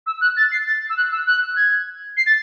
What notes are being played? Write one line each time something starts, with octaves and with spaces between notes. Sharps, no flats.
E6
F#6
A6
C7
A6
E6
F#6
E6
F#6
G#6
C7
A6